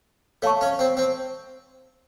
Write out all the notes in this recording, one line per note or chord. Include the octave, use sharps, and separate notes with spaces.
A3 C#5 F5 A5 C#6
C#4
C4
C4